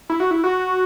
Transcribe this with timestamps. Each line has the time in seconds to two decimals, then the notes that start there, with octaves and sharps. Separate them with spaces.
0.10 E4
0.20 F#4
0.31 E4
0.44 F#4